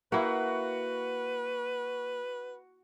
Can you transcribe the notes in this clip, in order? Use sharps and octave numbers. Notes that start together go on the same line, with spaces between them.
A#3 E4 F#4 B4